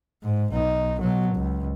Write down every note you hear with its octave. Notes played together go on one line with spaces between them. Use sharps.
G#2
B1 D#4
B2 F#3
C#2